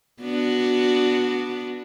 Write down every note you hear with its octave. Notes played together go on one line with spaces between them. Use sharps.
B3 D4 F#4